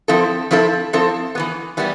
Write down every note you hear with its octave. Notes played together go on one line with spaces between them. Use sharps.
F3 C4 E4 A4
F3 C4 E4 A4
F3 C4 E4 A4
E3 G3 B3
E3 G3 B3